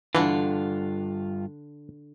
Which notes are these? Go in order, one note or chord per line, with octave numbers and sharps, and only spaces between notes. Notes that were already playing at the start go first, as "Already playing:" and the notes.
G2 D3 E3 D4 F4